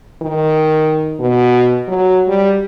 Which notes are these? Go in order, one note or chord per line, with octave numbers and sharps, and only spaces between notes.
D#3
B2
F#3
G3